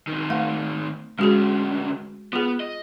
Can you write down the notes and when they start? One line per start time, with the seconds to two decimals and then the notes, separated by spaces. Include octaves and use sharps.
0.07 D#3 C4
0.30 A3 F5
1.19 D2 G#3 C#4 F#4 G#4
2.33 B3 F4 G#4
2.60 D#5